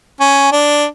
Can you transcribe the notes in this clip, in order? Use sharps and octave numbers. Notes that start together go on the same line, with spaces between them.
C#4
D4